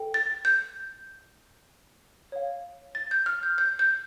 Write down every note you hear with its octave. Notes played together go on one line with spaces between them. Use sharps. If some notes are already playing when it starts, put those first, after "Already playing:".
Already playing: A4 G5
A6
G6
C#5 F5
A6
G6
F6
G6
G6
G6